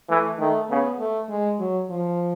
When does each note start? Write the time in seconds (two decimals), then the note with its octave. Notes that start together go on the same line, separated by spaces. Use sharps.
0.09 E3 A3
0.39 D#3 A3
0.69 C#3 B3
0.99 A3
1.29 G#3
1.59 F#3
1.90 F3